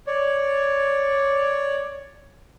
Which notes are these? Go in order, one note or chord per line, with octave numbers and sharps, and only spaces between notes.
C#5 D5